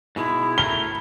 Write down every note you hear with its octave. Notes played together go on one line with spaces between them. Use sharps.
G#2 B2 G#3 E4
A3 A#4 G7